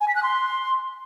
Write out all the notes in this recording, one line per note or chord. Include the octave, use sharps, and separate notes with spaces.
G#5
B6
F#6
C6